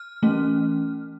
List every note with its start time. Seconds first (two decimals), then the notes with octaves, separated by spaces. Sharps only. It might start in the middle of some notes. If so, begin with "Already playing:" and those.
Already playing: F6
0.23 E3 A3 C#4